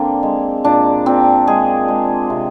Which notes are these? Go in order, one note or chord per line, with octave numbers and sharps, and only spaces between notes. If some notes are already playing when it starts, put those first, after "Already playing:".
Already playing: D3 A#3 C4 D4
G#3
A#2 D4
A#2 C4
G#3 G#4
G#3
C3